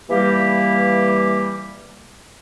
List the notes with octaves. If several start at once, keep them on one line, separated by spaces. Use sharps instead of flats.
E3 G3 A#3 G4